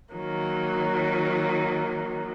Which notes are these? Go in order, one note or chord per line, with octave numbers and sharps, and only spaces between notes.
D#3 F#3 A#3